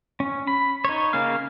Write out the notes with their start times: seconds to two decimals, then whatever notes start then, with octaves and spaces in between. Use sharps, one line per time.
0.20 C#4
0.47 B5
0.85 D#4 C#5
1.13 C#3 A#3 C#4 F5